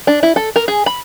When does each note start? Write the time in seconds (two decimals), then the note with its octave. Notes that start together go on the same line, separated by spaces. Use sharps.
0.07 D4
0.23 E4
0.36 A4
0.56 A#4
0.68 G#4
0.86 B5